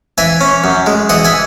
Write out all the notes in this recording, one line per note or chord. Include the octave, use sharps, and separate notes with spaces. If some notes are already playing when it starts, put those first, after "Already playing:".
E3 E5 G#5
C#4
F#2
G#3
E3 D#5 F#5
E5 G#5